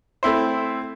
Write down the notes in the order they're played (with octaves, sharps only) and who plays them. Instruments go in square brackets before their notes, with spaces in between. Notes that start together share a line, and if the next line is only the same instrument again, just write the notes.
[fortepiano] A3 C4 E4 C5